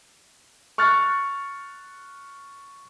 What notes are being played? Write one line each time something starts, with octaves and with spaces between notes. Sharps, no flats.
C#6 F6 F#6 A6 C#7